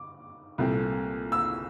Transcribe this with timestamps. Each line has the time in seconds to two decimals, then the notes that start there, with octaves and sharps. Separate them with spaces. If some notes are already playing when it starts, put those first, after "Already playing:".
Already playing: D6
0.58 C2 A#2 A3 C4
1.32 E6